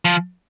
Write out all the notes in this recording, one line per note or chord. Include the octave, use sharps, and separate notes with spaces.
F3